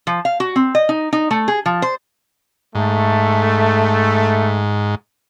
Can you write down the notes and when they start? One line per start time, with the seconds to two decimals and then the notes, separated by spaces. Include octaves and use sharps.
0.07 F3
0.25 F5
0.40 F#4
0.56 C4
0.75 D#5
0.89 D#4
1.13 D#4
1.31 A3
1.48 G#4
1.66 F3
1.82 C5
2.75 G#2 A3